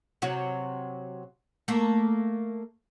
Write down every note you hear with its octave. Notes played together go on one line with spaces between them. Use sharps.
C3 F#3 F#4
A3 A#3